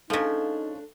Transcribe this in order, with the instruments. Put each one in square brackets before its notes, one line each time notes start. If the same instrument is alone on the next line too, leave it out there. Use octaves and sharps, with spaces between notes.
[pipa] C#3 F3 [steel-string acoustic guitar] A3 D4 [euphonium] D#4 [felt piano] A4 F5